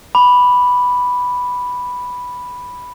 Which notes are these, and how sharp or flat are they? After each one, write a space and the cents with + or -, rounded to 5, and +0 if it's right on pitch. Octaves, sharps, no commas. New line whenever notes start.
B5 +0 D6 +0